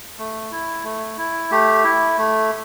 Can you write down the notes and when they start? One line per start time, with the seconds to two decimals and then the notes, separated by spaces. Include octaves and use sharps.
0.18 A3
0.51 E4
0.84 A3
1.18 E4
1.51 A3 G4
1.84 E4
2.18 A3